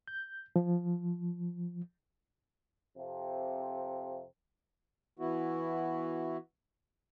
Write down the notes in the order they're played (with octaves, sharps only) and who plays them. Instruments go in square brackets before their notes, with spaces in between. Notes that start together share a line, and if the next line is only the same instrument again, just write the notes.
[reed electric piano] G6
F3
[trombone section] F2 C3
[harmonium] E3 B3 E4 F#4